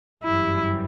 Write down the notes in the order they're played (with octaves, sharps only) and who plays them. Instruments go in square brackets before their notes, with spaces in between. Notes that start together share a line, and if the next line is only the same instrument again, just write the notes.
[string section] G1 F#2 E3 G3 [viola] E4